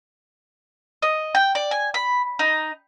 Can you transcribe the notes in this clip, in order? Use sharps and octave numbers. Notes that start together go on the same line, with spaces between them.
D#5
G5
D5
G#5
B5
D#4